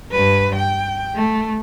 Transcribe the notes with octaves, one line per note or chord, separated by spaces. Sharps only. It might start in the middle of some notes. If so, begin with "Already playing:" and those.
G2 B4
G5
A3